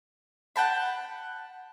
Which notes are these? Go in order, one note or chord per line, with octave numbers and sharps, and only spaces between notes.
F#5 G5 A5 B5